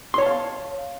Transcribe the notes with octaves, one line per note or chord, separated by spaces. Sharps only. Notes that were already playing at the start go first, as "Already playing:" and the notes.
C#5 F5 A5 C6